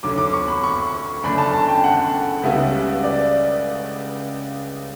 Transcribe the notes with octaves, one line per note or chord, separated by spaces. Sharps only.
D2 D3 F#3 D6
D6
C#6
B5
C#6
F#1 F#2 D3 A3 D4 B5
A5
A5
G5
F#5
C#2 C#3 G3 B3 F#4 E5
D5